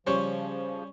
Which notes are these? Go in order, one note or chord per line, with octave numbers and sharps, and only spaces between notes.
C#3 F3 G3 C#4 C5 C#5 C#6